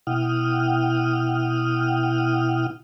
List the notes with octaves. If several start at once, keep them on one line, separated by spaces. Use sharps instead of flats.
B2 E4 F#5 G5 D#6 F6